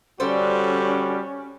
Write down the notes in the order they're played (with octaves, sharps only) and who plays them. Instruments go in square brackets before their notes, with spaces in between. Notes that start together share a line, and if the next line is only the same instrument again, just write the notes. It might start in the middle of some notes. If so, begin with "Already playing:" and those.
[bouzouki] D3 A4 C5 [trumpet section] G3 F#4 [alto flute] C#4